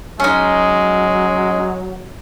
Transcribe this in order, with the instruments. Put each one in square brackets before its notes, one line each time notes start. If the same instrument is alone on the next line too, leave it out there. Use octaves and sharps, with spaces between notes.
[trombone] F#3 [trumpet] G#3 [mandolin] C#4 D#4